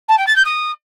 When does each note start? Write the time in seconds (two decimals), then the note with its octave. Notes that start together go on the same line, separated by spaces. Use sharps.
0.08 A5
0.17 G5
0.26 A6
0.36 G6
0.45 D#6